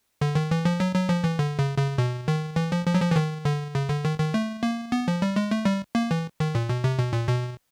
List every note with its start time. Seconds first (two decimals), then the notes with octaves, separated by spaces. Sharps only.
0.21 D3
0.35 D#3
0.51 E3
0.65 F3
0.80 F#3
0.95 F#3
1.09 F3
1.24 E3
1.39 D3
1.59 C#3
1.78 C#3
1.98 B2
2.28 D#3
2.56 E3
2.72 F3
2.86 F3
2.94 F#3
3.02 F3
3.11 E3
3.16 D#3
3.45 D3
3.75 C#3
3.89 D3
4.05 D#3
4.19 D#3
4.34 A3
4.63 A#3
4.92 B3
5.08 F3
5.22 G3
5.36 G#3
5.51 A3
5.65 G3
5.95 A#3
6.11 E3
6.40 D#3
6.55 A#2
6.69 B2
6.84 C3
6.98 B2
7.13 A#2
7.28 B2